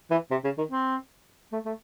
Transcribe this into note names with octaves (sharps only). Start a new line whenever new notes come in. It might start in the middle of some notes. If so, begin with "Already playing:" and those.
E3
C3
C#3
D#3
C4
A3
A3